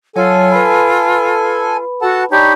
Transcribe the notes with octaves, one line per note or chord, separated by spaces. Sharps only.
F#3 F4 A4 C#5 G#5
B4 B5
F#4 A4 F#5 A5
D4 D#4 G4 C#5 G5 B5